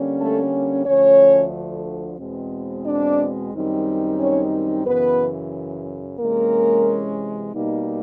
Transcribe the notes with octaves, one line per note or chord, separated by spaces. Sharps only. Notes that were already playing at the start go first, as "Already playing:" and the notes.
Already playing: D3 G3 A#3 C#4
A3 A4
D2 D3 F3 A3 C#4 C#5
E2 B2 G#3 C4
D4 D5
F#2 D#3 G3 C4 D#4
C#4 C#5
F#2 C#3 E3 B3 B4
C3 E3 G#3 A#3 C#4 A#4
B2 G3 A#3 D#4